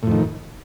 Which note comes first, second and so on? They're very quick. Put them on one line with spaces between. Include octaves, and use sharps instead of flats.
A2 F2 D#3